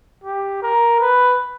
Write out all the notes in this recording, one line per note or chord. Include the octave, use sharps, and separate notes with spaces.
G4
A#4
B4